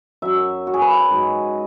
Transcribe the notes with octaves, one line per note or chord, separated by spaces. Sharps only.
F#2 F#3 E5
F#4
G#4
B4
G#2 F#3